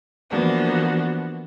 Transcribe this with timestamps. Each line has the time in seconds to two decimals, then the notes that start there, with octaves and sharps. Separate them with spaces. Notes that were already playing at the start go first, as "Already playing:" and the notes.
0.31 E3 F3 A#3 B3 D4 F#4